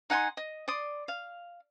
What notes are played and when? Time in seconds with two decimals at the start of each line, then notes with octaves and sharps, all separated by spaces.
0.10 D#4 F#5 G#5 C6
0.37 D#5
0.68 D5 C6 D#6
1.08 F5